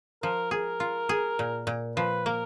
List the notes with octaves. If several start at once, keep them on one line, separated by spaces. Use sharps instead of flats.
F3 A#4
G#4 A#4
F4
G#4
A#2
A#2
F3 B4
A#3 A#4